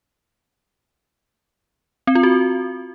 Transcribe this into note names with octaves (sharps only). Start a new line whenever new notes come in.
C4
F4
F#4